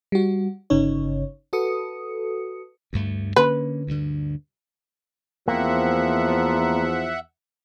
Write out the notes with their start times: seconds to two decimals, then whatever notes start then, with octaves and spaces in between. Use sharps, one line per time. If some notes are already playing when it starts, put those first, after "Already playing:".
0.12 G3 F#4
0.70 G1 C#3 C#4 D#4 C#5
1.53 F#4 A4 B4 D#6 C#7
2.93 D2 G2 A3
3.36 D3 A#3 C#4 B4
3.87 D2 G2 D3
5.48 E2 F3 A#3 C4 E5 F#5